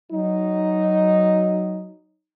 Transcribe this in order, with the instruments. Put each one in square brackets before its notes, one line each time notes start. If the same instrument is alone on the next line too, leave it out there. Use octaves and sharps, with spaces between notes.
[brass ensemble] F#3 D#4